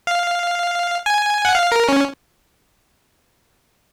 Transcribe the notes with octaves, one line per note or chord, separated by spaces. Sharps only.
F5
G#5
F#5
F5
A#4
C#4